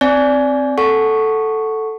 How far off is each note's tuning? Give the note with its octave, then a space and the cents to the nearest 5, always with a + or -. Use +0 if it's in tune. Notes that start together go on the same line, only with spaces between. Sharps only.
C4 +0 D5 -15 G#5 +20
A4 +0 F#5 +0 C#6 +0